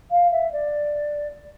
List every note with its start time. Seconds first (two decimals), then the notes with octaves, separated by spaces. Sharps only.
0.11 F5
0.32 E5
0.52 D5